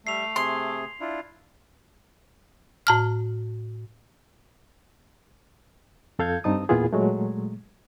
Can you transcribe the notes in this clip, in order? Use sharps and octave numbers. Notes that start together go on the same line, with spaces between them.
G3 A3 E5 C7 F7
C3 G#4 C6
D4 E4 F4
A2 A5 F6
F2 A4 F5 G6 G#6
G2 C4 D#4 A5 D#6
E2 A#2 B3 E4 F4 G#4
A#2 F#3 G#3 A3